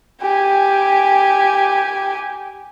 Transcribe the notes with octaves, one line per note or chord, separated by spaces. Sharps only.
G4 G#5